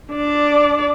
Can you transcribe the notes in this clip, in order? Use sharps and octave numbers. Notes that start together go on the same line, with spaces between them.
D4 D5